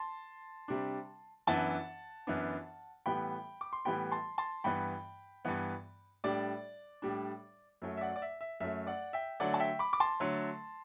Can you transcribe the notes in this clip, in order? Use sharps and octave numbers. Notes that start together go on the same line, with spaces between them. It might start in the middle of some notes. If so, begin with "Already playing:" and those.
Already playing: A5 C6
C3 G3 D4
F#2 E3 B3 D4 F#5 A5
F#2 E3 B3 D4
A2 E3 G3 B3 G5 B5
D6
C6
A2 E3 G3 B3 G5 B5
A5 C6
A5 C6
G2 E3 B3 G5 B5
G2 E3 B3
A2 G3 D4 D5
A2 G3 D4
F#2 F#3 A3
E5
D5 F#5
D5
E5
E5
F#2 F#3 A3 E5
D5 F#5
E5 G5
D3 F#3 A3 D5 F#5
A5
E5 G5
B5 D6
D6
A5 C6
D3 F#3 A3